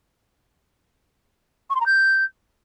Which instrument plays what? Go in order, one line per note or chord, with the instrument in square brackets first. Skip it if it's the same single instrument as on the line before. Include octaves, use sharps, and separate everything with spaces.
[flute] C#6
C6
A#5
G6